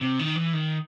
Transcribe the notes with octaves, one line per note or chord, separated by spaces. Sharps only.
C3
D#3
E3
D#3